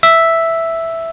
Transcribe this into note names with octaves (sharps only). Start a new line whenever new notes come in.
E5